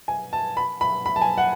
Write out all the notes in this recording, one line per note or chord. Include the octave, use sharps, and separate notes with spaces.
G#5
A5
B5
B5
B5
A5
G#5
F#5